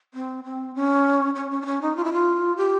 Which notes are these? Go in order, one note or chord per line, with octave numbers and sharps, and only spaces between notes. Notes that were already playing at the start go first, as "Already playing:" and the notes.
C4
C4
C#4
C#4
C#4
D4
C#4
D#4
F4
E4
F4
G4